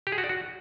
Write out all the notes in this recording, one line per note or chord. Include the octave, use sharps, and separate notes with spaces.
G4
G#4
F#4
D5
F#4